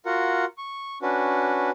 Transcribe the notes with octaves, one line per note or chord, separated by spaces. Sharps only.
F4 F#4 A#4 F#5
C#6
C#4 D4 F#4 B4